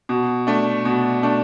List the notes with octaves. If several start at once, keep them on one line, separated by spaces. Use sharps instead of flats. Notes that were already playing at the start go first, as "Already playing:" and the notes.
B2
A3 D4
B2
A3 D4